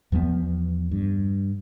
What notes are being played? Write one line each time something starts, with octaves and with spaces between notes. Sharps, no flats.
E2 F3 G3 B3
G2